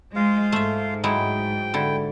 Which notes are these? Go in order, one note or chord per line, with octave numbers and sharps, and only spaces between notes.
G#3 F4 C5 F5
G#2 A3 E5
F#3 G#3 E4 G5
D3 E4